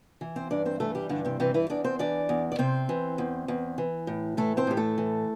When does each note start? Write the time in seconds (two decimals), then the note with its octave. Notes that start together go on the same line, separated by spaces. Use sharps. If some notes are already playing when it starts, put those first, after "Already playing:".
0.21 E3
0.36 C4 C5
0.51 G2 D4 D5
0.66 C4 C5
0.80 E3 A3 A4
0.95 G3 G4
1.09 G2 D3 D4
1.25 C3 C4
1.40 C3 E3 C4
1.54 E3 E4
1.70 E2 D4 D5
1.84 C4 C5
1.99 E3 D4 D5
2.29 E2
2.52 D5
2.59 C3 C4 C5
2.89 E3
3.18 E2
3.48 E2
3.78 E3
4.07 A2
4.37 E3 A3 A4
4.57 C4 C5
4.67 A2 G4
4.77 A3 A4
4.98 E3